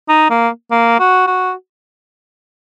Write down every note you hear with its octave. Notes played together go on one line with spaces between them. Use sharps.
D#4
A#3
A#3
F#4
F#4